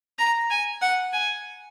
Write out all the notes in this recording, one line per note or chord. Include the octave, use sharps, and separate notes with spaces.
A#5
G#5
F#5
G#5